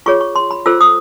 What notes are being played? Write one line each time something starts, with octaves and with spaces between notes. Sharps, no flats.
F4 G#4 C#5 C#6
C#6
C6
B5
F4 A4 C5 E6
D#6